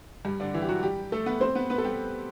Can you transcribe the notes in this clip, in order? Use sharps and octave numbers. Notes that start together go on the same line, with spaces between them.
G2 G3
D3 D4
E3 E4
G4
F#3 F#4
G3 G4
A3 A4
B3 B4
C4 C5
B3 B4
B3 B4
A4
G3 G4